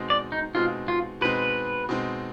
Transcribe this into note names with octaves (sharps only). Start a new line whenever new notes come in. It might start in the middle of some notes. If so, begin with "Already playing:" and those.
Already playing: B2 G#3 C4 D#4
D5
D#4
B2 G#3 C4 D#4 F4
F4
B2 G#3 C4 D#4 B4
B2 G#3 C4 D#4